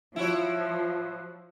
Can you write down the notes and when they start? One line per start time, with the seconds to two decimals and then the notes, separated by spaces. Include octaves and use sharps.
0.16 F3 E4 F#4 C#5